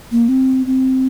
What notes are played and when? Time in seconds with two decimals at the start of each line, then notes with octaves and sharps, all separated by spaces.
0.12 A#3
0.29 C4
0.66 C4